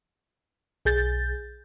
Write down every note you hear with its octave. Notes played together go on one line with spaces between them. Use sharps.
B1 G#4 G6 A6